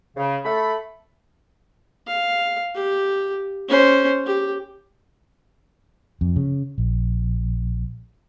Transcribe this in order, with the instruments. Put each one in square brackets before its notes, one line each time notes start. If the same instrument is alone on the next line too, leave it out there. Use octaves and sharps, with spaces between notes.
[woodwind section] C#3
A3 B5
[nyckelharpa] F5
G4
C#4 C5
G4
[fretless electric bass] F2
C#3
A#1